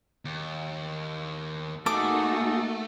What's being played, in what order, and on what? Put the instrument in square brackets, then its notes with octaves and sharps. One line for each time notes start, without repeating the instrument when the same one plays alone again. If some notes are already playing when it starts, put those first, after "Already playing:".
[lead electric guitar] D#2
[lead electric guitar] A3 [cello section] A#3 D#4 F#4 [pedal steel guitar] G#4 A4 [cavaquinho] D6